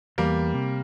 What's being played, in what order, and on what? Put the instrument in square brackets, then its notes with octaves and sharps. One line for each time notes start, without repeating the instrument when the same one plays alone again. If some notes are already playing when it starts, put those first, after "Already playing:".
[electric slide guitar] E2 [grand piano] G3 A#3
[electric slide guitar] C3